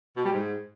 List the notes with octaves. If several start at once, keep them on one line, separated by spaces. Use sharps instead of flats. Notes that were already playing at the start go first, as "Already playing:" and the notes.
B2
G3
G#2